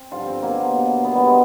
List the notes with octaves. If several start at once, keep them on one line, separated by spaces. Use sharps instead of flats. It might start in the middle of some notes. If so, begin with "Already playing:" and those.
Already playing: C4
G2 D3 F3 F4
C4
B2 F#3 A#3
B2 F#3
B2 F#3 B3
G3
G#3